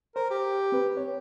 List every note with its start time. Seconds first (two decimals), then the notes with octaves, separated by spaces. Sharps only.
0.16 A#4 C5
0.31 G4
0.72 C4 B4
0.97 C#5